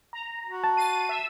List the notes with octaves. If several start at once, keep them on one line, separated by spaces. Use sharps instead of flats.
A#5
F#4
A5
A6 C7 D#7
E5 E6